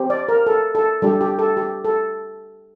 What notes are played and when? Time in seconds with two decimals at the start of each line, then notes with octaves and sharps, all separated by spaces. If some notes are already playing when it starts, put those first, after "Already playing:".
Already playing: C4 G4
0.10 D5
0.29 A#4
0.47 A4
0.75 A4
1.02 G3 D4 G4 A4
1.21 G4
1.39 A4
1.57 G4
1.85 A4